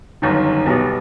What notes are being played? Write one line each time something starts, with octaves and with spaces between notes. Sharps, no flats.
G1 F#2 D#3
B1 B2 G3 B3